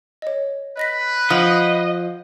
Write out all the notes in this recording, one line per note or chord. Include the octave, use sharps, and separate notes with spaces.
C#5 D#5
B4 D#5 A#6 B6
F3 D#5 F#5 D#6 F#6